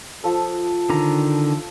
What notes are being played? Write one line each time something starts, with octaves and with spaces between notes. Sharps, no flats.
F3 A4 D#6
D3 D#3 A#5